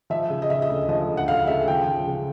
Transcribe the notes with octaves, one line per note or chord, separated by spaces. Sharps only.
F3 E5
C#3
D#5
C#3 E5
D#5
D2
F3 D#5
D2
F#5
D2 F5
C#3 E5
F3 G5
F3
C#3